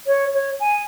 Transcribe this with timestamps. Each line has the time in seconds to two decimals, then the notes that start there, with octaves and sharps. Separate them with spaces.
0.07 C#5
0.34 C#5
0.60 G#5